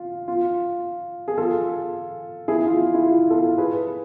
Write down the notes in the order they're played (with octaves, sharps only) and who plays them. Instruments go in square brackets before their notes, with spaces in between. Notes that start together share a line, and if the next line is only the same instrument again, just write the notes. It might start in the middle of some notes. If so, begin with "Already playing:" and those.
Already playing: [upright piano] F4
F4
G#4
F4 A4
E4 G#4
F4
E4
F4
F4 A4
G#4 B4